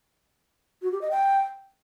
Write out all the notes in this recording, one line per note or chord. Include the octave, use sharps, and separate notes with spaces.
F#4
G4
D#5
G5